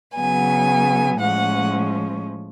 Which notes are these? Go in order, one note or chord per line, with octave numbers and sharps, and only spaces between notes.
C#3 F#3 B3 G#5
A2 F3 G#3 C#4 F#5